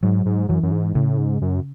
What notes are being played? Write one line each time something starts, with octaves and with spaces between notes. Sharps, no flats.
G#2 F#3
G#2
F#2 E3
F#2
G#2
A2 C#3
G#2
F#2